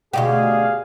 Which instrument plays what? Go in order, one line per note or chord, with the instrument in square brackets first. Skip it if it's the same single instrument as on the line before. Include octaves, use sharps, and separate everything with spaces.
[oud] D2 B2 G4 [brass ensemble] G#4 F5